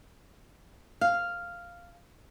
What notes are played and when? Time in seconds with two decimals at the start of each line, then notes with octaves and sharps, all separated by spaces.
1.01 F5